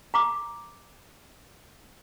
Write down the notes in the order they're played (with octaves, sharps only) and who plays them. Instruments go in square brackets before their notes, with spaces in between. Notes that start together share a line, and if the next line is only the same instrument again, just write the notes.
[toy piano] A#5 D6